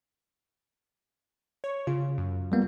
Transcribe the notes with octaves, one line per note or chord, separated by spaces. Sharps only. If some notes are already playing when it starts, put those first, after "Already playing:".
C#5
C#3 F4
F#2
G3 A#3 B3